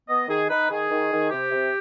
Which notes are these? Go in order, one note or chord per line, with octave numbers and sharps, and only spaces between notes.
B3 D#5
D#3 G#4
D#4 B4
D#3 G#4
D#3
D#3
C3 G4
C3